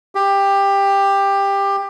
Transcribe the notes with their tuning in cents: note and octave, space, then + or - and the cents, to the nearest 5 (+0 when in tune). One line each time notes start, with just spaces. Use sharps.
G4 +15